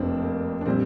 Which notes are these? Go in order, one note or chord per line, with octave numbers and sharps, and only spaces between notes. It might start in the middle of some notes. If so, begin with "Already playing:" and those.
Already playing: F1 F2 A#3 C4 D4
A#3
D4
A#2 G3 C4